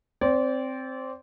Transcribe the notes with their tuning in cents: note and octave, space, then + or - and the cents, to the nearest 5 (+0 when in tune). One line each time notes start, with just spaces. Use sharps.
C4 +0 D5 -30